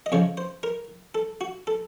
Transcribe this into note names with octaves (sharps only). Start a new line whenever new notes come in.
D#5
F2 C#3 F3 C#5
C5
A#4
A4
F#4
A4